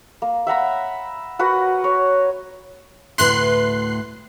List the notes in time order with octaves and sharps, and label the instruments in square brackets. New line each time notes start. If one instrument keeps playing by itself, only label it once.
[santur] A#3
E5 F#5 A#5 B5
F#4 A#4 B4 F#5
C#5
[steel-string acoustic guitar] D2 A2 B4 [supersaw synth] C6 F#6 C7